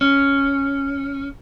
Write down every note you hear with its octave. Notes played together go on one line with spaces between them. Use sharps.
C#4